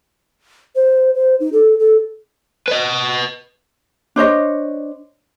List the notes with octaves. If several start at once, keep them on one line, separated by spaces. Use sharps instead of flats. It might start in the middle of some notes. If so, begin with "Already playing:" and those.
C5
C5
D#4
A4
A4
B4 D#5
D4 C5 C#5 D#5